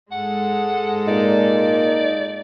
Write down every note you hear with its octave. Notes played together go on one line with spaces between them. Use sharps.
G#2 G#3 A4 F#5
A#2 D#4 D5